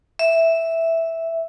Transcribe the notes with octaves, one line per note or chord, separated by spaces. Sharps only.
E5